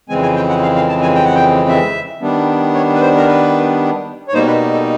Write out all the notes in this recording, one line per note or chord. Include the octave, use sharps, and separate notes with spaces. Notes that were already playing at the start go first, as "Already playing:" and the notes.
F2 C#3 E3 G#3 C4 G#5
G#5
G5
F#5
F5
F5
A5
G#5
G5
F#5
G5
E5
D#3 G3 B3 D4
C#5
B4
C5
A#4
B4
C#5
B2 G3 A#3 D#4 C5
B4
A4